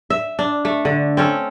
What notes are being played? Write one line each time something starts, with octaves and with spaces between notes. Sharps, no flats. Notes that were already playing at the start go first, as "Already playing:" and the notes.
E5
D4
A3
D3
C4 C#4 A4